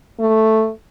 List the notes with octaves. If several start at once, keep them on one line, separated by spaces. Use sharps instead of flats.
A3